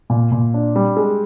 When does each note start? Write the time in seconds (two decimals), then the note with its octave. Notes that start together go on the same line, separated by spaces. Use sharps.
0.10 A#2
0.32 A#2
0.54 D4
0.76 G3
0.97 G#3